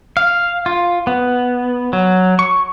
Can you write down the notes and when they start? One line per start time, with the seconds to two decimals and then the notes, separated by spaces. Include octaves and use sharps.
0.17 F5
0.66 F4
1.07 B3
1.93 F#3
2.39 C#6